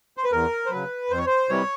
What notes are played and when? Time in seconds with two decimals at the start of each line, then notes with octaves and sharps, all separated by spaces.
0.17 C5
0.24 B4
0.32 E2 A#4
0.66 C5
0.71 C#3 F#3 B4
1.10 F2 C5
1.18 C#5
1.26 C5
1.49 C3 E3 G3 C#5